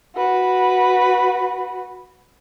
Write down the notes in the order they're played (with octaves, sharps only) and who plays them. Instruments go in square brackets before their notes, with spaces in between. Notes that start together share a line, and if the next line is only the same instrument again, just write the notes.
[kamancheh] F#4 B4